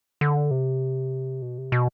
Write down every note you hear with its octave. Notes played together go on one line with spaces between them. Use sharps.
D3
C3
B2
C3
B2